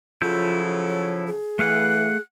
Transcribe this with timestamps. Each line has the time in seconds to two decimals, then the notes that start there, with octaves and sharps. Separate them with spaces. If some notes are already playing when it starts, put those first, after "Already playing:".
0.22 C#3 F3 F#3 E4 F4 A4 G6
0.88 C#5
1.27 G#4
1.59 E3 A3 F5 F#5 F#6